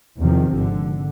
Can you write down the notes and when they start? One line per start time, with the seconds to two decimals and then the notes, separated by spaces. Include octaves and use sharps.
0.19 E2 C3 D#3 F3
0.54 G#1 D3